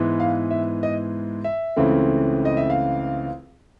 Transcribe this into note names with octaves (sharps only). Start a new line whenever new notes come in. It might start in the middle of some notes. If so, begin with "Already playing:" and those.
Already playing: G#2 E3 G#3 B3
F5
E5
D#5
E5
C#2 C#3 E3 A3 C4
D#5
E5
F5